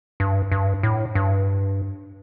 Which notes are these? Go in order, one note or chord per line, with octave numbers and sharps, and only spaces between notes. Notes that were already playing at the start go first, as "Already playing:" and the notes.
G2
G2
A2
G2